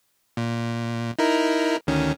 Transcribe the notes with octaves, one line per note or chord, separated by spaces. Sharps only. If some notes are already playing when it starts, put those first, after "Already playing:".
A#2
D#4 E4 A#4
D2 D#3 C#4